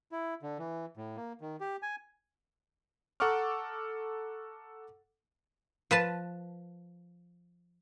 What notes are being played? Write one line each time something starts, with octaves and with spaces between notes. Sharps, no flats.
E4
D3
E3
A2
A#3
D#3
G4
G#5
A4 F#5 A#5 C#6 D6 F6
F3 B4 A5